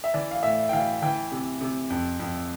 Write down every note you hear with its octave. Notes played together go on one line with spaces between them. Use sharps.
E5
E3 D5
F5
A2 E5
G5
E3 F5
E3 G5
C3
C3
F2
F2